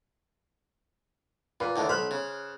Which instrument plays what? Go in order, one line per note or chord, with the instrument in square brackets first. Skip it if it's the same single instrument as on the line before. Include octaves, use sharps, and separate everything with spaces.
[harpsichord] A#2 [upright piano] B4 F5
[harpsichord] D#2 A2 D3
[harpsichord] B1 B5 [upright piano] C5 F6 F#6
[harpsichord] C#3